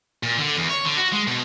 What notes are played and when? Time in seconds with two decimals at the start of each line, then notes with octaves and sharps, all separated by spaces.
0.23 A#2
0.38 D3
0.57 E2
0.70 C#5
0.85 D3
0.98 F#4
1.13 G#3
1.27 B2